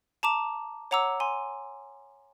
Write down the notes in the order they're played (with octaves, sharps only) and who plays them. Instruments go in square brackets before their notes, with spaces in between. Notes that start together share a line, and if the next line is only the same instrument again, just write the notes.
[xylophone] A5 A#5 D6 E7
C#5 F#5 A#5 D6 E6
G#5 C6